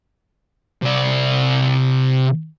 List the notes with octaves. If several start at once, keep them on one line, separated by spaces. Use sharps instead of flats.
C3 D5